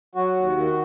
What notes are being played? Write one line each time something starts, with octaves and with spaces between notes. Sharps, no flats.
F#3 F#4
D#2
D#3